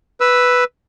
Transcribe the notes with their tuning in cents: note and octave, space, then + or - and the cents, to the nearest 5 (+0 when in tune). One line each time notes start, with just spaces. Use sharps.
B4 +0 E6 +0